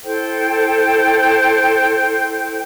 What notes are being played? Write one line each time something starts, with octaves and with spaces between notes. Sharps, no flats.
E4 A4 C5 G5